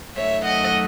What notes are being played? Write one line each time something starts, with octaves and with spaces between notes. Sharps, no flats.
F#2 D#3 F#3 A3 C#5 E5
D#5 F#5